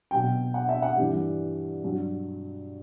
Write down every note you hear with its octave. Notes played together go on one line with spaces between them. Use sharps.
B2 F#3 G5
F#5
E5
F#5
G2 E3 G3
G2 F#3